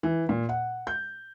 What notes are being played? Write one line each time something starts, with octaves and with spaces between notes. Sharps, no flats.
E3
A#2
F#5
G6